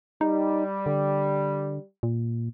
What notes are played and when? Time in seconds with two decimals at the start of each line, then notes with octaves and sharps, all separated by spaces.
0.21 G3 D#4
0.86 D3
2.03 A#2